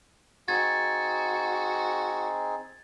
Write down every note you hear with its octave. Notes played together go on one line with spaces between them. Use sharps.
C4 D#4 F#4 G#4 G#6 A6